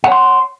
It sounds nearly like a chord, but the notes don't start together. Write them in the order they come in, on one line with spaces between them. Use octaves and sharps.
F#5 C#5 C6